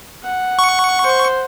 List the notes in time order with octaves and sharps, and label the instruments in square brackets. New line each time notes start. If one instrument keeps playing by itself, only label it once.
[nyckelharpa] F#5
[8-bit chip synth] C#6
[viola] C5